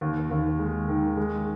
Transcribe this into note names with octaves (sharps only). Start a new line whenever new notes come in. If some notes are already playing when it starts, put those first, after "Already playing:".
D#2
D#2
G#3
D#3
G#3